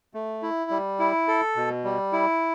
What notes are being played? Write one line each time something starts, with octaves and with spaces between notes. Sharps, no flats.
A3
E4
G3
E4
A4
B2
G3
E4